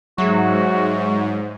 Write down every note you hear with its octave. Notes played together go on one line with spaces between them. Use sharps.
G#2 F#3 G#3 F#4 G#4 E5